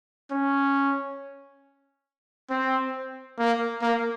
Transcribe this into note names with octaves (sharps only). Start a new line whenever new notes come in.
C#4
C4
A#3
A#3